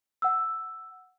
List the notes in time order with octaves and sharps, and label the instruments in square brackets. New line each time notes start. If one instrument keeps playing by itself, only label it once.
[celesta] F#5 E6